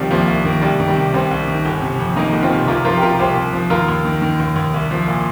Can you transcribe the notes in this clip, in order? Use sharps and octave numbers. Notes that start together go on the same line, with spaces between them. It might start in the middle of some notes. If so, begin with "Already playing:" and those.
Already playing: C2 C3 D#3 F3 G3
C2 F3 A#3
C2
D#3
C2 G3
D#3
G3
C3
C2 G3 C4
C2
D#3
G1
C3
F2
D#3 A#3 D#4
G1
C4 F4
C3
C2 F4 A#4
F3 F4 A#4
G4
C3 F4 A#4
C2 G4 C5
C2
F3
D#2 F4 A#4
D#2
D#3
D#3
D#2
D#2
C2
F3
A#2